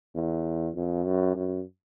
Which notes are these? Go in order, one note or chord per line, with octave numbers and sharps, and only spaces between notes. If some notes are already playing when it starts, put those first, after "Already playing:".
E2
F2
F#2
F#2